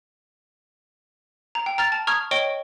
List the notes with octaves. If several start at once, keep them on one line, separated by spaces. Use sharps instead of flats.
A#5
G5
A#5 F6 A6 F7
A5
A#5 C#6 D#6 F6 G#6
C#5 D#5 G5 C#6 D7 G7